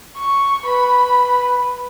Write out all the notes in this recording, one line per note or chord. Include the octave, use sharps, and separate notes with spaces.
C#6
B4 B5